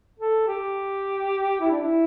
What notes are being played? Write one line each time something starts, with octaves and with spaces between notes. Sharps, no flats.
A4
G4
E4
D4
E4